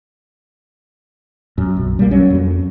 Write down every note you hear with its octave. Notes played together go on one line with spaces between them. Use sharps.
F#2
B1
G3 A#3
F#3 C#4
F2